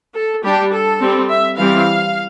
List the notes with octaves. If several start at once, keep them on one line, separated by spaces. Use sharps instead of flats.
A4
G3 D4 G4
A4
G3 C4
E5
E3 G3 C4 F5